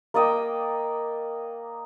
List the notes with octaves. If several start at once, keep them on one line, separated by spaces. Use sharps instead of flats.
A#3 D5 D#5 G5